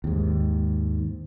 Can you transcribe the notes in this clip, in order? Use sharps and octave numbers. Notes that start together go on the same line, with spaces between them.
D#2 G#2